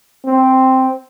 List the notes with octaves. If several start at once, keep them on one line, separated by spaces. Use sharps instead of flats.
C4